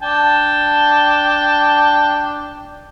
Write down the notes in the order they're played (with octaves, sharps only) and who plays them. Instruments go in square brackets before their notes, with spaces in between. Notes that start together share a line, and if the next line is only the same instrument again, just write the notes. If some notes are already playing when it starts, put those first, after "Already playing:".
[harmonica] D4 G5 A5